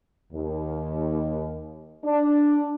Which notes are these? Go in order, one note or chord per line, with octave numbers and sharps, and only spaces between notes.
D#2
D4